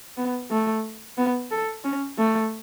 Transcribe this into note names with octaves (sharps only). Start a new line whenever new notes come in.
B3
A3
B3
A4
C#4
A3